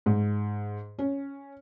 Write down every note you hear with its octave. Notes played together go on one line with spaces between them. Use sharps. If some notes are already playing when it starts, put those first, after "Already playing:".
G#2
C#4